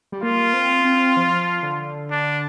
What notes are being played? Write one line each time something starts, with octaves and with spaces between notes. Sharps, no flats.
G3
A#3 F4
C4
C4
F3
D3
D4